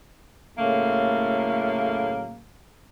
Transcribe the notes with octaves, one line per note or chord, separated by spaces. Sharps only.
A2 C#3 F#3 A3 A#3